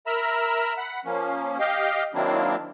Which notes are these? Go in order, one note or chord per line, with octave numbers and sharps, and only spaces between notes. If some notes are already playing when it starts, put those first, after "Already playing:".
A#4 E5 A#5 B5 E6
F#5 B5
F3 A#3 C#4
G4 D#5 F5 G5
D#3 F#3 A#3 C4 D4 E4